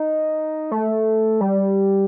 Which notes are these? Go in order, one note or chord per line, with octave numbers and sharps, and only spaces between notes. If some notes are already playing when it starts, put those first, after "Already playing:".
Already playing: D#4
A3
G3